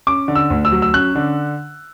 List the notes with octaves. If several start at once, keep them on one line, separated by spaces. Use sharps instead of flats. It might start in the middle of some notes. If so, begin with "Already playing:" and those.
C#4 D6
D3
E6
D2
E6
F#3
E6
C#4 F#6
D3